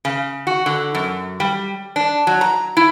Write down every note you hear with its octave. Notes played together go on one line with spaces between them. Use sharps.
C#3
F#4
D3
F#2
G3
D4
F#3
A#5
E4